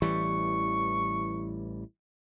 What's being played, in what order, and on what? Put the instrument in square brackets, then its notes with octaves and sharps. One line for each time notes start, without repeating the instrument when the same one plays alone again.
[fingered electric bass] A1 E3 G3 [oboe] C#6